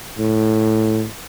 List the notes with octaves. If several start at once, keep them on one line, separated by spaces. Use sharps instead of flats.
A2